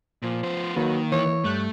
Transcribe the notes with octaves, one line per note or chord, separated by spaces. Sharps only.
A#2 F3
B3 C5
D#3 F#3 A#3 B4
E3 C#5
G2 A3 C#6 F#6 G6